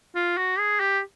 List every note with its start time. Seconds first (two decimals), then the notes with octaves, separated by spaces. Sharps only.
0.15 F4
0.38 F#4
0.59 G#4
0.80 G4